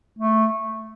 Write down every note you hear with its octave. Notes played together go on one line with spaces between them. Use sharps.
A3